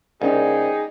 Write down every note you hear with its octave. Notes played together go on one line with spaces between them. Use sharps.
C2 G3 A#3 C#4 D#4 G#4